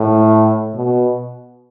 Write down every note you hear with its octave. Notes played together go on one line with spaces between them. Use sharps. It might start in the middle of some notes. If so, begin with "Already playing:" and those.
Already playing: A2
B2